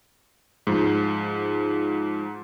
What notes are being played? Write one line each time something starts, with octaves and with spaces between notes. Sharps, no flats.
G#2 F3